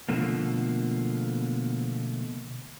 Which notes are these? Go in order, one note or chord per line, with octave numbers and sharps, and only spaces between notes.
B2 D3 F3 A3 A#3